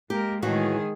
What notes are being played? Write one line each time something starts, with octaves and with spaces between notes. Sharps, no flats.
G#3 A#3 G4 A#4
A2 D#3 E3 G#3 F#4 G#4